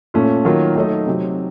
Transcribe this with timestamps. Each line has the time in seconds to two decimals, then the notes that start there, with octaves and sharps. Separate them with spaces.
0.14 A#2 A3 C#4 F4
0.45 D#3 F#3 A#3 F4
0.76 F#3 A3 D#4 A4 D#5
1.07 C3 F#3 C4